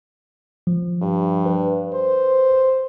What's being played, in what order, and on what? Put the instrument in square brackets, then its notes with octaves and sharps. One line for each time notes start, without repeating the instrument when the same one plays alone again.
[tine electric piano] F3
[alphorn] G2
[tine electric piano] B4
[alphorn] C5